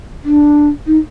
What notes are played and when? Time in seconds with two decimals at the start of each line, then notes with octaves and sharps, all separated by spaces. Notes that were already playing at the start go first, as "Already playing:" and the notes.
0.24 D4
0.87 D#4